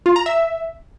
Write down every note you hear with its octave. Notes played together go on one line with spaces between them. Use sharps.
F4
A#5
E5